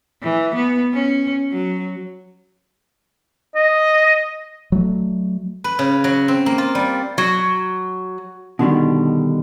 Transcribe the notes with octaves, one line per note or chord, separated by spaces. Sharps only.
E3
B3
C#4
F#3
D#5
F#3 A3
B4
C#3
F#3
C4
A#3
F4
G3
F#3
B2 D3 D#3 G3